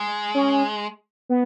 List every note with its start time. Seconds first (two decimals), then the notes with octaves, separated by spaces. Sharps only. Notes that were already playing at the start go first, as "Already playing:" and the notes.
Already playing: G#3
0.34 C#4
1.29 B3